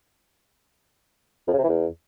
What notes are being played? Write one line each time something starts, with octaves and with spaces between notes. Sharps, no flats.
F2
C#3
C3
E3
E2